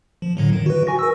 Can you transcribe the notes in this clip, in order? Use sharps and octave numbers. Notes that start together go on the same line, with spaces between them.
F3
A2 D3 F#3
D#3
F#4 B4
G#5 C#6 A#6
A#4 E6